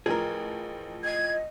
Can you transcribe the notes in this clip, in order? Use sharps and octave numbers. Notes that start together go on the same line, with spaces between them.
A1 F3 G#4 A#4
D#5 G#6